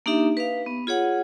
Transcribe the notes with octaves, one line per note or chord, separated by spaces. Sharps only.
A#3 D4 D#4 G4 E5
B4 F5
B3
F4 G#4 C#5 F#5